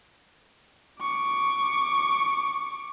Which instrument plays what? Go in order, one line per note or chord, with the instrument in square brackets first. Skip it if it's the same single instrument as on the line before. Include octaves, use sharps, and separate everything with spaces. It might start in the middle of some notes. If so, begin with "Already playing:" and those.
[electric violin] C#6 D6